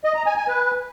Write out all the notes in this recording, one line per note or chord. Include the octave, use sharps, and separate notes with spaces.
D#5
A#5
G#5
G#5
B4